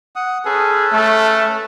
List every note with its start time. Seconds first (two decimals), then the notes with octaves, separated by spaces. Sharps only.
0.16 F#5 D#6
0.45 C#4 G#4 A4 B4
0.92 A3